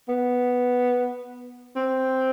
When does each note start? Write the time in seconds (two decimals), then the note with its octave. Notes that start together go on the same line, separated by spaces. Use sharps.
0.09 B3
1.76 C4